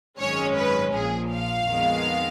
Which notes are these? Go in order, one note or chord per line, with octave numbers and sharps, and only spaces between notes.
G#1 F#2 D#3 G#3 C#4 C#5
B4
A#1 A#2 F3 G#4
F5
F2 D#3 G#3 B3